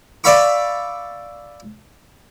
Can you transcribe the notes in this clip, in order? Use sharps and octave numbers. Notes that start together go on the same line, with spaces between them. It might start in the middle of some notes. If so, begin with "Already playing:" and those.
D5 E5 F5 B5 C#6